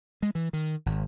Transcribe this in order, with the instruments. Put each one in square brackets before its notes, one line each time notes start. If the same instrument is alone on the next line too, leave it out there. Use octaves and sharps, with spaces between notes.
[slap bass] G#3
E3
D#3
G#1